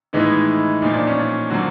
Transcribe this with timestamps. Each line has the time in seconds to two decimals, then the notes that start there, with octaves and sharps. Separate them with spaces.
0.13 A2 D#3 E3 G#3 B3 D#4
0.82 A#2 F3 A#3 D#4
0.94 D4
1.07 C#4
1.19 D4
1.50 D3 F3 F#3 A#3 F#4